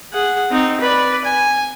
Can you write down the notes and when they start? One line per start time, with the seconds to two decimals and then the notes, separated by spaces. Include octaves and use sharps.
0.13 G#4 F#5
0.51 C4 D#4
0.81 B4 D5
1.25 G#5